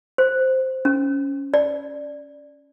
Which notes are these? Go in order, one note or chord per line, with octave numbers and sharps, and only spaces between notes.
C5
C#4
D5